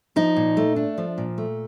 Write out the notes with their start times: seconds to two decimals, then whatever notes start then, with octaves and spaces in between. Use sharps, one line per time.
0.16 F3 D#4
0.36 A#2
0.57 A3
0.76 D4
0.98 F3
1.18 A#2
1.38 A3